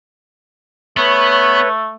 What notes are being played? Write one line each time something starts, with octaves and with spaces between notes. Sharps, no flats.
A3 B3 B4 C#5